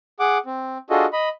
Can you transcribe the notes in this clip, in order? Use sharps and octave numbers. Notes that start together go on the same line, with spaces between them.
G#4 F#5 D6
C4
D4 F4 F#4 G#4 A4 D#5
D#5 B5